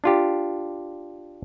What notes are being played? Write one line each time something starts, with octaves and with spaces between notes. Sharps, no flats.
D4 F4 G4